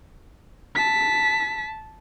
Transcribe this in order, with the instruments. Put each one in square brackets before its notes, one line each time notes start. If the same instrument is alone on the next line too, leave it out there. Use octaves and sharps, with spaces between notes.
[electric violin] A5 B6